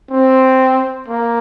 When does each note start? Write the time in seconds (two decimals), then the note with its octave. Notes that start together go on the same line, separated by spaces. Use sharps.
0.11 C4
1.08 A#3